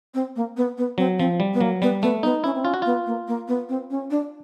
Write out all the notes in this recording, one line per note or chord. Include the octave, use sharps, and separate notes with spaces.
C4
A#3
B3
B3
F#3 C4
F3 C4
G3
B3
F#3 A#3
G3 B3
A3 B3
B3 D#4
C#4 E4
C4
C#4 F4
F#4
B3 F4
A#3
A#3
B3
C4
C#4
D4